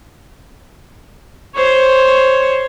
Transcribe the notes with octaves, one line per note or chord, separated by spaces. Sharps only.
C5 C#5